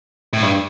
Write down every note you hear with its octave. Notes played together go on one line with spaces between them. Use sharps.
A2
G2